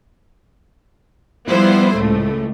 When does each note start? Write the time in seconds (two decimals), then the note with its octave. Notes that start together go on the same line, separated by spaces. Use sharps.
1.49 F3 G3 B3 E4 F4 C5
1.96 C#2 A2 A3